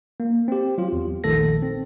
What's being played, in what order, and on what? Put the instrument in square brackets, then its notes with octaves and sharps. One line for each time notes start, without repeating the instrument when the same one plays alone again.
[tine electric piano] A#3
C4 G4
F#3 F4
E2
A#1 D#3 A3 A4 A#6
C4